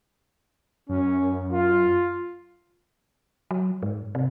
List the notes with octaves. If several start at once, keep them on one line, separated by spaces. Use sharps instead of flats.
F#2 C#4
F4
F#3
G#2
C3